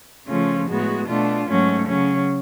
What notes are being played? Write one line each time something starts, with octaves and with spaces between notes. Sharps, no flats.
C#3 F3 A3 C#4 F4
A2 G#3 B3 F#4
B2 A3 D4 F4
G#2 F#3 A3 C#4
C#3 F#3 C#4